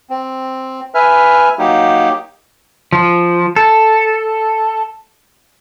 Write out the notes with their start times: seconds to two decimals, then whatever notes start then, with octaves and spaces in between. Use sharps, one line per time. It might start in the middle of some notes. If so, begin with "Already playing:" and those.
0.10 C4
0.95 B4 E5 G#5 F6
1.59 F#3 A#3 D#4 G4
2.92 F3
3.56 A4